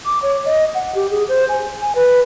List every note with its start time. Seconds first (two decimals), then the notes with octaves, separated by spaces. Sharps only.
0.05 D6
0.22 C#5
0.45 D#5
0.75 F#5
0.95 G4
1.11 G#4
1.29 C5
1.49 G#5
1.81 G#5
1.95 B4